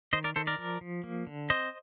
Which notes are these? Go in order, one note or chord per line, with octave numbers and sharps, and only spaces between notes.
D#3 C5 D#5
A#4 D5
D#3 A4 C5
A#4 D5
F3
F3
A#3
D3
C4 C5 D#5